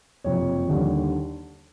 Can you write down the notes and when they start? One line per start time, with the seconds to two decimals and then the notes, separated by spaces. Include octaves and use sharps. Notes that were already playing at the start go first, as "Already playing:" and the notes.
0.24 F#1 F2 C3 F3 C#5
0.68 D#2 D3 G3